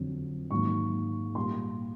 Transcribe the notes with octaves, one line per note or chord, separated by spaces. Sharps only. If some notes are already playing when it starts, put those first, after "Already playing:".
Already playing: F2 D3 F#3
G#2 D#3 F#3 A#3 C#6
A#2 G3 A#3 C6